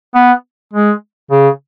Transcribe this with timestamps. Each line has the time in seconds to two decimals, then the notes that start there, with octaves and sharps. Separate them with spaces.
0.15 B3
0.74 G#3
1.31 C#3